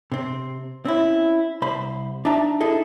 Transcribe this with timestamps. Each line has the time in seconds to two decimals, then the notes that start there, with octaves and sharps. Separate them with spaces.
0.12 C3 C4
0.85 C4 C#4 E4
1.62 C2 C5 B5
2.25 D4 D#4 E5 A5 A#5
2.60 D#4 E4 G#4 A4 D#5